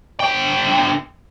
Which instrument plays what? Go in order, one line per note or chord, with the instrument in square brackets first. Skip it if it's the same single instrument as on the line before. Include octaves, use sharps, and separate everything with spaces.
[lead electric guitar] D3 G5